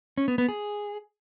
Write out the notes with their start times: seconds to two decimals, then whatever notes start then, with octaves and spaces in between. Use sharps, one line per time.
0.18 C#4
0.28 B3
0.38 B3
0.49 G#4